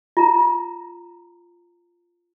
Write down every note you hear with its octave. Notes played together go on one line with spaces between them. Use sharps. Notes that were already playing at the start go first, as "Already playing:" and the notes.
F4 A#5